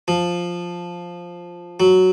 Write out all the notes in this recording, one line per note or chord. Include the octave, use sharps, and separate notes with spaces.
F3
F#3